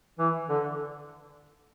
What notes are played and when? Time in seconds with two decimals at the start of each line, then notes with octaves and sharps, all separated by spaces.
0.19 E3
0.49 D3